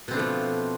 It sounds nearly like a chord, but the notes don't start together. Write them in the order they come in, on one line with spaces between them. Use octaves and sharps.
B2 C4 D4 A3 F3